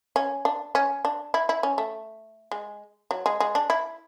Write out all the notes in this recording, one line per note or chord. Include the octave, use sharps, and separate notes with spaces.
C#4
D4
C#4
D4
E4
E4
C#4
A3
G#3
F#3
G#3
G#3
D4
E4